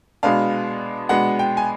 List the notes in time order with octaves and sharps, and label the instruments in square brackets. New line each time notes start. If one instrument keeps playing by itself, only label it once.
[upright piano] B2 G#3 B3 D4 [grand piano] F5
[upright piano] B2 G#3 B3 D4 [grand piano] F#5
[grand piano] G5
G#5